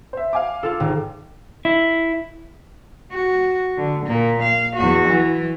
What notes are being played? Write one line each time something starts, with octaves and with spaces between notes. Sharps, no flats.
C5 E5
F5 G#5 D6
F4 A4
G#1
E4
F#4
D3
A#2 A#3
F5
E2 F#4
E3